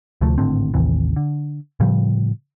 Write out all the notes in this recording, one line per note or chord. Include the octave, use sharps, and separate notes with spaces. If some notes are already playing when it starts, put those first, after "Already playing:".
D2 C3 F3 A3
G#1 A2 D3 C4
A1 D#2 C3 E3
D3
A2 C#3 F3 G3